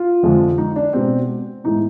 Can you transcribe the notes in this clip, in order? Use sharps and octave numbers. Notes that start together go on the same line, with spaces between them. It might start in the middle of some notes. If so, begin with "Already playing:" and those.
Already playing: F4
F2 D3 F3 G#3
D#4
D4
B2 G#3 B3 C4
A2 E3 G#3 B3 D#4